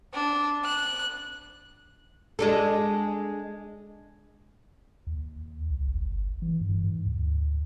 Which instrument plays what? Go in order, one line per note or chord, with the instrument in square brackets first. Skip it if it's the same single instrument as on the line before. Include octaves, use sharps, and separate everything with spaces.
[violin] D4
F#6
[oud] G#3 D4 A4
[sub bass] D#2
C2
G1
E3
G2
G#2
D2